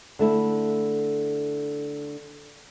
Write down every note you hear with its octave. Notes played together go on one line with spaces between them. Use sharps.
D3 A3 E4